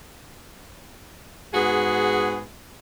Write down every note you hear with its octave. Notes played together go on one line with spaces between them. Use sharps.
G#2 B3 F#4 G#4